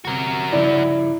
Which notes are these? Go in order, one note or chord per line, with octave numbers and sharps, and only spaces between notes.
G1 C3 F#4 A#4
G2 C#3 F3 E4 D5